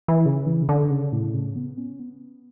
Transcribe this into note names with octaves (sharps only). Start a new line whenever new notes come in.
E3
C#3
E3
C#3
D3
C#3
A2
C#3
B3
C#4
B3